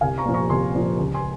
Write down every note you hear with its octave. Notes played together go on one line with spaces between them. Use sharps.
C2 F5 G#5
A#5 C#6
A#2 F3
A#5 C#6
C2 G#5 C6
A#2 F3
C#2
G#5 C6